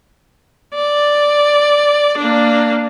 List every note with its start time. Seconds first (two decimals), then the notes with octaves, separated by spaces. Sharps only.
0.75 D5
2.17 A#3 D4